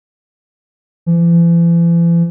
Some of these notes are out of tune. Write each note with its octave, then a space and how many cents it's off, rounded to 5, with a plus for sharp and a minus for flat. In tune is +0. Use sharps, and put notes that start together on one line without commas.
E3 +45